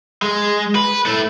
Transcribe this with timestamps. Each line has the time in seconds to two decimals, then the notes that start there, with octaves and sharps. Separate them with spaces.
0.22 G#3
0.75 B4
1.06 A3 E4